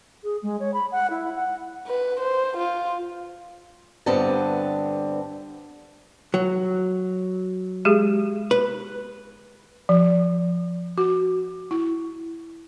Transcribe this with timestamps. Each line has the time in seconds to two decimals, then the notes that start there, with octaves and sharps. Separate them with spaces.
0.23 G#4
0.42 G#3
0.59 C#5
0.73 B5
0.91 F#5
1.10 E4
1.35 F#5
1.87 B4
2.20 C5
2.57 F4
4.06 G2 D3 B3 C4 D5 A5
6.34 F#3
7.85 G#3 G4 G#4
8.51 B4
9.89 F3
10.98 F#4
11.71 E4